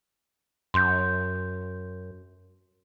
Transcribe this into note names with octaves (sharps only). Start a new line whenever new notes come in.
F#2 C6 G6